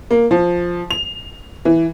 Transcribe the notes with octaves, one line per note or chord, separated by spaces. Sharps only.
A#3
F3
F7
E3